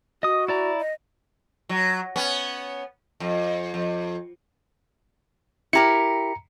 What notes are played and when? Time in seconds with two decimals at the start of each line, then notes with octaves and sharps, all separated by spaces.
0.23 F#4 D#5 D#6
0.48 E4 D5 A#5
0.80 D#5
1.69 F#3
2.16 B3 C#4
3.20 F2
3.74 F2
5.73 E4 G4 A#4 A#5 C#7